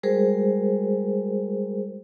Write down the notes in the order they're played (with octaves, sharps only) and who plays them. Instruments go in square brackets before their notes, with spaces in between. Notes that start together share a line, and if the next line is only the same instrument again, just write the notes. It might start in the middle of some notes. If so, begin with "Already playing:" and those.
[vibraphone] G3 G#3 F#4 G#4 A#4 C5